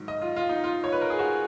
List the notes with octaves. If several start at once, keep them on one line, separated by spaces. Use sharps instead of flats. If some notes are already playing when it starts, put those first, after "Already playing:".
Already playing: G#2 D#3 F#3
D#5
F4
F4
D#4
F4
C#5
B4
A#4
G#4
F#4